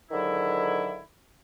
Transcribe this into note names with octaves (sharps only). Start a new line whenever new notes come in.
G#2 D3 D#3 F#3 E4